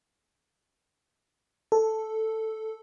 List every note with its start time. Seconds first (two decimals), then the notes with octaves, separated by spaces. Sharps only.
1.72 A4